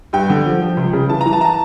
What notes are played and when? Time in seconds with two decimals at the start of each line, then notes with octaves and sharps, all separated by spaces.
0.13 G2 G5
0.30 D3
0.46 F3
0.62 F3
0.77 C#2
0.93 C#3
1.09 E3 A5
1.21 E3 A#5
1.33 A5
1.41 A#5
1.45 A5